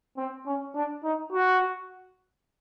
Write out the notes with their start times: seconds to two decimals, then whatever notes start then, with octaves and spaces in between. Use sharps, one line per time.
0.17 C4
0.46 C#4
0.75 D4
1.03 D#4
1.32 F#4